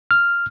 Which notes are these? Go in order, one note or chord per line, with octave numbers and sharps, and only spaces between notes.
F6